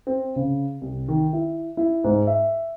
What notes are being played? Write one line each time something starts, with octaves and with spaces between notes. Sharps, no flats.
C4
C#3
C2
D#3
E4
E4
G#2
E5